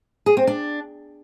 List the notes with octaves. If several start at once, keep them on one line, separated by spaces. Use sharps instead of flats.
G#4
C4
D4